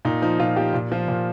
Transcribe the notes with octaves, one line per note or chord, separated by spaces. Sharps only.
A#2 D#4
F3 D#4
A#2 F4
F3 G4
A#2
F3 F4
A#2